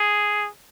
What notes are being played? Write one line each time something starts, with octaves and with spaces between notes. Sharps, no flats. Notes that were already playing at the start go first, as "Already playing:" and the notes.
Already playing: G#4